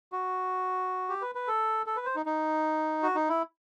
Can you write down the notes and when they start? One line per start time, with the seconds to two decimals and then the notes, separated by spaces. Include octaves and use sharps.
0.12 F#4
1.09 G4
1.22 B4
1.35 B4
1.48 A4
1.86 A4
1.96 B4
2.06 C5
2.16 D#4
2.26 D#4
3.03 F#4
3.15 D#4
3.29 E4